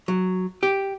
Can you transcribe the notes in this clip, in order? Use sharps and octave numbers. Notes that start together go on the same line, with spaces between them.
F#3
G4